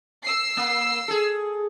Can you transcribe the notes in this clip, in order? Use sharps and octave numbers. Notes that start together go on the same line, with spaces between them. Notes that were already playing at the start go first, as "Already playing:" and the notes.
E6 C7
A#3
G#4 A4